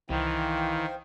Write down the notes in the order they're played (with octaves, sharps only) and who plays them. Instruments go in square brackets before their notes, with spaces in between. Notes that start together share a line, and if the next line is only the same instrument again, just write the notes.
[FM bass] C2 [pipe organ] D#3 [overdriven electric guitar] E3 [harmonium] C5 F5 G5